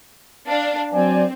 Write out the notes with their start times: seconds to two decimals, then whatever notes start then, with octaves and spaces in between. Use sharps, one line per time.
0.46 D4 F5
0.93 F#3 C4 D5 G#5